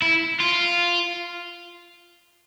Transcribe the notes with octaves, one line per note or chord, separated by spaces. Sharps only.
E4
F4